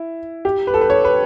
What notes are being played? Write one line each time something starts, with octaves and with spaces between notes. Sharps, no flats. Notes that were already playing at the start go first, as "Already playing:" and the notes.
Already playing: E4
G4
B4
A4
B4
C#5
B4